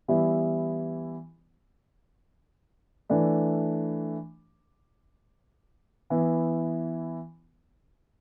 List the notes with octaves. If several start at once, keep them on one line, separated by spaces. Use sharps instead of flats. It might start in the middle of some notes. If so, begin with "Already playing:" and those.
E3 G3 B3 E4
E3 A3 D4
E3 B3 E4